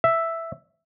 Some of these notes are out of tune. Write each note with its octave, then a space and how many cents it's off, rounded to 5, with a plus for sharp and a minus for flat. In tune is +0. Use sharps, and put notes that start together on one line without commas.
E5 +0